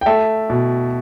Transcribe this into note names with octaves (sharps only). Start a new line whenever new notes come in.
G5
A3 E5 A5
B2